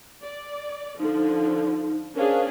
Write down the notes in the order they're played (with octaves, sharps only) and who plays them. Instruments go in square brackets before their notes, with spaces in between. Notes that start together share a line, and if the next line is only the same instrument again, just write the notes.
[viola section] D5
[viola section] D3 F3 [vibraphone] D#4
[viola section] C#4 D4 G#4 [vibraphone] A#4 C5 F5